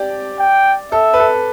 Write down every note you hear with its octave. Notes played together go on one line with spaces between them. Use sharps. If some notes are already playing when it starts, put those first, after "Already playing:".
Already playing: G4 D5
G5
A4 E5
B4
A4